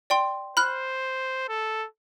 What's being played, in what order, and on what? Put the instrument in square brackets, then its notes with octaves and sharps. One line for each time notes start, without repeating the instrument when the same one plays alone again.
[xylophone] D5 G5 C6
[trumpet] C5 [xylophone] B5 F6 F#6
[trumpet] A4